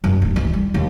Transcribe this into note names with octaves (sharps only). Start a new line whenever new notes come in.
F#2
D1
E3
G3
D#2